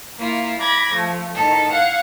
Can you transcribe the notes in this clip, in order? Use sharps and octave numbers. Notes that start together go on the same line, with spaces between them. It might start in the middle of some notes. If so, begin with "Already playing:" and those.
A#3 E4 F4
B5 D6 G#6 A#6
F3 A3
A2 D#3 A4
F5 F#5 G#6